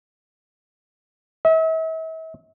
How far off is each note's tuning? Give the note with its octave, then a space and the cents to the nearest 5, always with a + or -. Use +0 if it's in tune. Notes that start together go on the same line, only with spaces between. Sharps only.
E5 -40